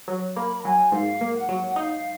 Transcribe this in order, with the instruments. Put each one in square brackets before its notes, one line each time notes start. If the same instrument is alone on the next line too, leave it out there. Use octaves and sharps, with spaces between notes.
[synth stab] F#3
[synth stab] A#3 [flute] B5
[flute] A#5
[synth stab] F#3 [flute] G#5
[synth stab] G#2 [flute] F5
[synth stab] A#3
[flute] F#5
[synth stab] F#3
[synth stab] D#4 [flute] F5